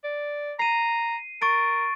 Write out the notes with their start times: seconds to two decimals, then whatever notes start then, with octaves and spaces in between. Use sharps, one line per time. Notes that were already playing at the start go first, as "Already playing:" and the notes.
0.04 D5
0.59 A#5 C7 D#7
1.42 A#4 C#6 A6 D7